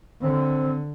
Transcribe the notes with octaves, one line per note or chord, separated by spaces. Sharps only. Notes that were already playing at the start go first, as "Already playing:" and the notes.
D3 C4